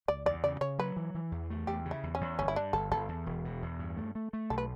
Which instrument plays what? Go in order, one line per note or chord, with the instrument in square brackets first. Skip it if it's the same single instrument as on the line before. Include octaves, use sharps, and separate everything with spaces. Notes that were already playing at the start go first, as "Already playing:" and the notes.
[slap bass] C#2 [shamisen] D5
[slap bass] E2 [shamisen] D5
[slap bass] C#3 [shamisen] D5
[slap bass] C#3 [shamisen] C#5
[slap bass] F#3 [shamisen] B4
[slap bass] E3
E3
E2
A3
[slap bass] E2 [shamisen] G4
[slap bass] C#3
[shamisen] E4
[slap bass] E2
[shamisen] C#4
[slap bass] E2
[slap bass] G1 [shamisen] C#4
[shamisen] E4
[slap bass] G2 [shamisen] D4
[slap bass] G1 [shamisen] A4
[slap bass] G1 [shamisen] A4
[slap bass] E2
E1
B2
E2
G2
A3
A3
A3
[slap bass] B1 [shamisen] A4
[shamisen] B4